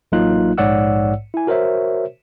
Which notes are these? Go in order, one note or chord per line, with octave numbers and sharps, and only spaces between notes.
A1 F#3 A#3 D#4 F4 F#6
A#1 G#2 C#5 D5 F#5 E6
E4 G#5
F#4 A#4 C5 C#5 E5